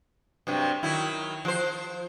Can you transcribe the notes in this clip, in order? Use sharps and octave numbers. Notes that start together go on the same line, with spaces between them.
G2 C3 F#3
D#3 F#3 E4
F3 C5